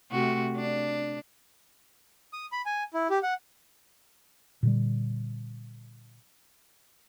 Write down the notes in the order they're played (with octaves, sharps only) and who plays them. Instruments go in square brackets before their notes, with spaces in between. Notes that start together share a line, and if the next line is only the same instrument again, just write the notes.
[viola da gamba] C3 A3 F#4
D4
[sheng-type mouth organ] D#6
B5
G#5
E4
G4
F#5
[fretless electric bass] A#2 D3 G3